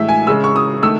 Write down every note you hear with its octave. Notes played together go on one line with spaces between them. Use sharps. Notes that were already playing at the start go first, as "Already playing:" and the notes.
Already playing: A2 E3 G#3 E5
G#5
C#3 G#3 E6
C#6
D#6
D#3 A3 E6